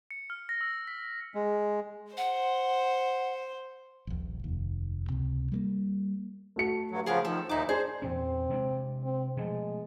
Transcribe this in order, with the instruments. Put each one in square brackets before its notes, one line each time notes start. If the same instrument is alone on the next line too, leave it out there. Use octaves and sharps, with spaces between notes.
[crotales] C#7
F6
A#6
E6
B6
[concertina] G#3
[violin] C5 [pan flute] F#5
[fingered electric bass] D#1 A#1
F1 D#2
C#2 C3
G3 A3 A#3
[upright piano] A3 F#4 C#7
[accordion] G2 F#3
[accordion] C#3 F3 B3 [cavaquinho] G#4 A#4 F5
[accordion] D#3 F3 [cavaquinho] A4
[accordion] D#2 A#2 D#4 [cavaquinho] E4 D6
[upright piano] D4 [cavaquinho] G#4 [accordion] C5
[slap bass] E2 A#2 C#4 [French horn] C4
[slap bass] C3 G#3 D4
[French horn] C4
[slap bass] B2 F3 A3 [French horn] G#3